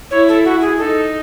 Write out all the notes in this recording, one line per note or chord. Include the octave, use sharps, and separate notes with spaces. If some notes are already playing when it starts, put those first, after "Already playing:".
E4 C#5
A4
F#4
G#4
D#4 A4